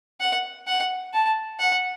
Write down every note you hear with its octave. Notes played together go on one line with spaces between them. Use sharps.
F#5
F#5
A5
F#5